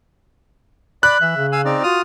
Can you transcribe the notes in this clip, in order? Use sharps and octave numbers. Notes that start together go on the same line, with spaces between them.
D5 B5 F#6
E3 E5
C#3
F5 G#5 E6
C4 D#4 D5
F4 F#4 D#6 F6